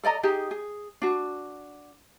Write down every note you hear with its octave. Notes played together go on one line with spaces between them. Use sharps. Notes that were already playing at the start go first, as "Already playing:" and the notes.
A4 D5 D#5 A#5
D#4 G4 G#4
G#4
D4 F#4